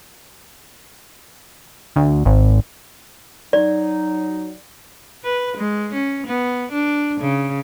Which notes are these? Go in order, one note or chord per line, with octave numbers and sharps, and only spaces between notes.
D2
G#1
F#3 D#4 D5
B4
G#3
C#4
B3
D4
C#3